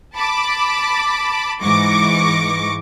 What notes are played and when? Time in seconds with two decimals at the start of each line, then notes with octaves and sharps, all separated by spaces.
0.16 A5 B5 D6
1.62 G#2 E3 C#6 D6 A#6